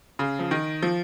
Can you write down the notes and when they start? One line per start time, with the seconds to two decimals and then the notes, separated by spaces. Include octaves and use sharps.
0.19 C#3
0.39 F3
0.51 D#3
0.82 F3